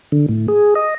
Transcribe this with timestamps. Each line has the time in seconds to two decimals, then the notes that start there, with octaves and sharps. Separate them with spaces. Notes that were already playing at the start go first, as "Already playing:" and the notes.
0.12 D3
0.29 A2
0.48 G#4
0.75 D#5